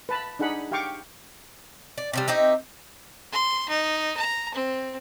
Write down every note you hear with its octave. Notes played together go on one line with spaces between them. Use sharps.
B4 A5 B5
D4 D#4 G#4 F#5 B5
G4 F5 G5 C#6 D6
D5
C3 F3 G3
C4 D#4 G4 E5
C6
D#4
A#5
C4